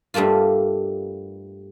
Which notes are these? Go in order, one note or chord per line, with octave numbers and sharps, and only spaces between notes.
G2 G3 A3 A#3 F4